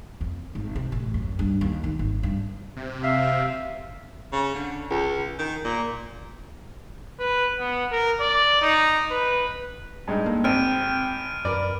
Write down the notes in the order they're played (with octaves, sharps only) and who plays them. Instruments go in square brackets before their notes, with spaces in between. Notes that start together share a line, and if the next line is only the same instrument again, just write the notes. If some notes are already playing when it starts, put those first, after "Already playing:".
[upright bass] F2
G#1
C3
A1
F#2
G2
D#2
D#3
G#1
G2
[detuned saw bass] C3
[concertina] E5 F5
[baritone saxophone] C#3
D3
C#2
D#3
A#2
[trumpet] B4
B3
A#4
D5
D#4
B4
[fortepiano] G2 G#3 D#4
[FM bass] A#3 [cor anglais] A4
[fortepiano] G#1 [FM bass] C4 [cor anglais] G5 [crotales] F6 D7 D#7
[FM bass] F#2 [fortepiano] A#4 D5 [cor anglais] B4